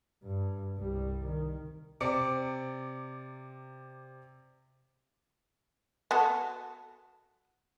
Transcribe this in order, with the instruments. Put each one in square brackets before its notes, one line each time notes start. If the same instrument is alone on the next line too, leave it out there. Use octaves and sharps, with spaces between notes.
[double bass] G2
C2 G3
D#3
[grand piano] C3 D5 D6 C#7
[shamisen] B3 F#4 A4